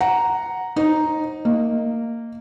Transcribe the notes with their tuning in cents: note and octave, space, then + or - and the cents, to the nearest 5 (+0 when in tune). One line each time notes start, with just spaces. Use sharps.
F#5 +0 A#5 +0
D#4 +0 C5 +35
A#3 -15 D#5 +0